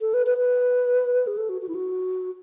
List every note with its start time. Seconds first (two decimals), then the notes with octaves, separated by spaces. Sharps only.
0.01 A4
0.14 B4
0.26 B4
0.38 B4
1.27 G#4
1.37 A4
1.49 F#4
1.62 F#4
1.68 E4
1.75 F#4